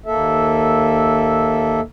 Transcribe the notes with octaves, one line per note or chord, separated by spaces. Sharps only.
D#2 A#3 A4 E5